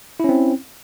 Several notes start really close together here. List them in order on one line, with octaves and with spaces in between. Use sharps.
E4 C#4 C4